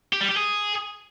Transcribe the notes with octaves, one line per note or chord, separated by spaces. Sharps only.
G4
G3
G4
G#4